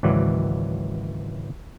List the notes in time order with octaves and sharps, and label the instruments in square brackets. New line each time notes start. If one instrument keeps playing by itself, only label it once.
[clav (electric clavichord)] G#1 C#2 E3 F#3 D5